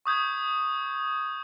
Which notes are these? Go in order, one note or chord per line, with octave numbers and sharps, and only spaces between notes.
C#6 D#6 G6 G#6